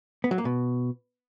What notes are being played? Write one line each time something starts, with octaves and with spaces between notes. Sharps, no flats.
B3
F#3
A#3
B2